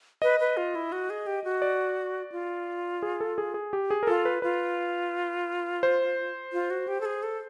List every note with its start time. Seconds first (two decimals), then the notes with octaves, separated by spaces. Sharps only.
0.22 B4 D#5
0.40 B4
0.57 F4
0.75 E4
0.92 F#4
1.10 G#4
1.27 G4
1.44 F#4
1.62 D5
2.32 F4
3.03 G#4
3.20 A4
3.38 G#4
3.54 G#4
3.73 G4
3.91 G#4
4.03 A#4
4.07 F4 A4
4.25 B4
4.42 F4 B4
5.83 C5
6.53 F4
6.70 F#4
6.88 G4
7.01 A4
7.05 G#4
7.23 A4